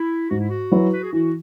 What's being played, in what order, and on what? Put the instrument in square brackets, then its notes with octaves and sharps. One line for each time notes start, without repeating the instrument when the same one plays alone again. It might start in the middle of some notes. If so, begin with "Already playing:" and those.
Already playing: [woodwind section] E4
[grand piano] G#2 [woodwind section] F#4
[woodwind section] E4
F#4
[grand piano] F#3 E4 B4
[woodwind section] B4
G#4
[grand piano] E3 [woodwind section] F#4